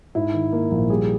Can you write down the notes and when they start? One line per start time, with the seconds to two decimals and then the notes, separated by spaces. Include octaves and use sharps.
0.15 G#2 E4
0.34 D#3
0.53 A#3
0.72 A#1
0.90 G3 G#4